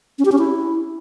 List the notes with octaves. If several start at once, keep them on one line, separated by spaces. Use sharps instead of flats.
C#4
G4
C#4
E4